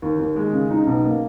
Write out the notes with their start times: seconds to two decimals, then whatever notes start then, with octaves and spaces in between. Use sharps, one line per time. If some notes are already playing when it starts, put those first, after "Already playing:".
0.02 D#2
0.19 D#2
0.36 G#3
0.53 C#3
0.70 D#4
0.87 B1
1.04 A#3